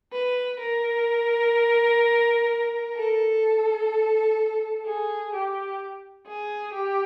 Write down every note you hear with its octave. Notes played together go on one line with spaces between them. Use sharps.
B4
A#4
A4
G#4
G4
G#4
G4